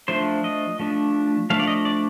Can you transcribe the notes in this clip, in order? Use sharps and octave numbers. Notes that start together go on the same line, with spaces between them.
F3 A3 D4 C5
D#5
F3 A3 D4
F3 A3 D4 F5
D5
D#5
D5